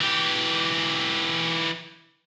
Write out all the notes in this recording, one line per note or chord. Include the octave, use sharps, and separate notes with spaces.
E3 G4